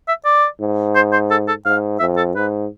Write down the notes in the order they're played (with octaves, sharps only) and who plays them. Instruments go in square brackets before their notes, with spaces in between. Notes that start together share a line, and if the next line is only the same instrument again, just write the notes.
[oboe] E5
D5
[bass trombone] G#2
[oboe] C5
C5
A4
A4
[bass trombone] G#2 [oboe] F5
[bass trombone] F2 [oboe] E5
[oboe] A4
[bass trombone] G#2 [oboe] B4